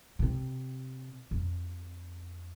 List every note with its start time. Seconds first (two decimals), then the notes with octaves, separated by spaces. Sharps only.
0.19 C3 C4
1.31 F2